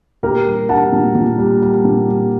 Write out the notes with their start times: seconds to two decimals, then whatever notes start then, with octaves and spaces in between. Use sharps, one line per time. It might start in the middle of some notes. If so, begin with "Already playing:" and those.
0.23 A#2 G4 A#4
0.46 G3
0.69 G3 F#5 A5
0.92 A#2
1.15 A#2
1.38 G3
1.62 G3
1.85 A#2
2.08 G3